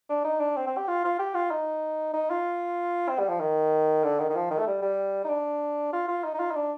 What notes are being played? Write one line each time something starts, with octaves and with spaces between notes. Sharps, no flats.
D4
D#4
D4
C4
C4
G4
F4
F4
G4
F4
D#4
D#4
F4
C4
G3
F3
D#3
D3
D#3
D#3
F3
D#3
A3
G3
G3
D#4
D4
F4
F4
D#4
D#4
F4
D#4
D4